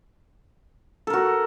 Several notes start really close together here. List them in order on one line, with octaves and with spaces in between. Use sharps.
A4 A#4 F#4